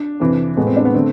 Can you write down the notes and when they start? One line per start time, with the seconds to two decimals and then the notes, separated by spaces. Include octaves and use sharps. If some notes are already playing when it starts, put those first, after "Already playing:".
Already playing: D4
0.20 F2 C3 E3
0.57 A2 G#3 B3
0.67 C4
0.77 D4
0.85 B3
0.94 D3 A3 C4